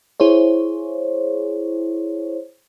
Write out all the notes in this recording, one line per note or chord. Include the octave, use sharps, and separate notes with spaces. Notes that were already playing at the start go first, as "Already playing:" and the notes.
E4 G#4 C5 C#5